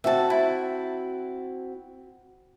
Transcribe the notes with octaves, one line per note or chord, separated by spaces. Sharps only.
C4 F#4 E5 A5
E4